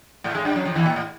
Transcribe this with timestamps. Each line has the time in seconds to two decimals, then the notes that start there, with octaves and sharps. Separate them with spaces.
0.24 A2 A3
0.35 G#2 G#3
0.45 G2 G3
0.55 F#2 F#3
0.65 F2 F3
0.75 E2 E3
0.86 A#2
0.96 A2